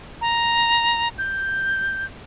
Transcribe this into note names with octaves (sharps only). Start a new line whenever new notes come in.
A#5
G6